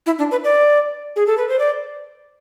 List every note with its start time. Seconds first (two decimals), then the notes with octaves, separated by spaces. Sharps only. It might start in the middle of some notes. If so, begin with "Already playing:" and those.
0.06 E4
0.19 D4
0.31 B4
0.44 D5
1.16 G#4
1.27 A4
1.38 B4
1.49 C5
1.59 D5